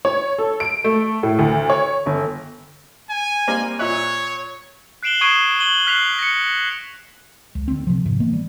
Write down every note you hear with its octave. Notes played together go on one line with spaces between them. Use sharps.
C#5
A4
D7
A3
A2
D2
C#5
G1
G#5
G3 A#3 C4
A#2 C#5 E5 F#6
F#6 C7 D7 E7 F#7 G7
C#6 D#6 G#6 C7 D7 D#7
C#6 G#6 D#7 F#7 G7
F6 F#6 B6 C7 F7
A#6 C#7
C#2
D2 C4
C3 F3
G#2 C3 F3
E3 A#3 B3
G3